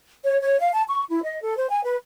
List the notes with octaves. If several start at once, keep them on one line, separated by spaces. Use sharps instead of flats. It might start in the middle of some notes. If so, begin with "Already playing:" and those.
C#5
C#5
F5
A5
C#6
E4
D#5
A4
C5
G#5
B4